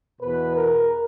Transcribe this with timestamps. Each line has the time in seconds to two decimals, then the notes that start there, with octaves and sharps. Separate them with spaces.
0.21 E2 B2 B4
0.56 A#4